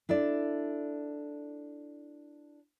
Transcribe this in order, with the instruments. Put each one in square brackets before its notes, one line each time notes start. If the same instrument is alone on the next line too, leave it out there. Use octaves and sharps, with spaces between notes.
[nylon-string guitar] D4 E4 A4 D5